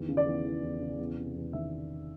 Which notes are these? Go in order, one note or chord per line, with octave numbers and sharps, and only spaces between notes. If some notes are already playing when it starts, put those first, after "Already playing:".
Already playing: E2 D#3
C#3
D5
E2
E3
E2
C#3
E2
C3
E2
D#3 E5